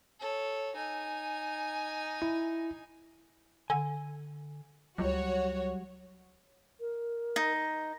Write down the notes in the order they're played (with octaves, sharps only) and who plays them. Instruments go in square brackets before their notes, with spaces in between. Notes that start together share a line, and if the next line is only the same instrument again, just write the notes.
[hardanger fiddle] A4 C#5
D#4 G#5
[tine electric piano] E4
[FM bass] D3 [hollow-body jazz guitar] G#5
[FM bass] C#2 [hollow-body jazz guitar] F#3 G3 [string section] F#4 C#5
[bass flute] A#4
[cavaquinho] D#4